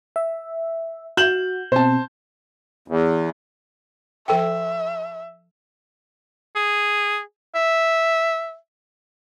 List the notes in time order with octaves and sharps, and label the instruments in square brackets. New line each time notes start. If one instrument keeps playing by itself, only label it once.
[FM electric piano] E5
[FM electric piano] F#4 [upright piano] G6 E7 F#7
[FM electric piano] B2 C4 [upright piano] C5 A5
[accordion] E2
[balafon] F3 A4 G5 [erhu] E5
[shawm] G#4
E5